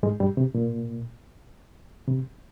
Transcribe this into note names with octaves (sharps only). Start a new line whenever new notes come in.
G#2 G#3
G2 G3
C3
A#2
C3